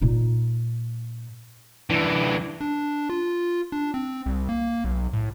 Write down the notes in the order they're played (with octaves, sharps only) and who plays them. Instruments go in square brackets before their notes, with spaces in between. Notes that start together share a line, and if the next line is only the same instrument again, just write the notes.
[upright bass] A#2 D#4
[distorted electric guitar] D3 E3
[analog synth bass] D4
F4
D4
C4
C2
A#3
B1
A2